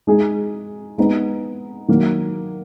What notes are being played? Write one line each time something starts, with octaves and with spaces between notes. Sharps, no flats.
G#3 D#4 G#4
G#3 B3 D#4
D#3 F#3 A#3